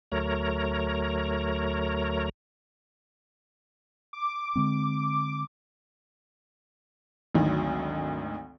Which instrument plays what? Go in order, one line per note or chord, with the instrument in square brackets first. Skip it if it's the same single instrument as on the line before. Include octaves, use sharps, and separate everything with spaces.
[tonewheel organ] D2 F#3 A3 A#4 C#5 A#5
[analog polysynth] D6
[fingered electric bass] D3 G#3 C4
[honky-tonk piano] G#1 D2 D#3 F#3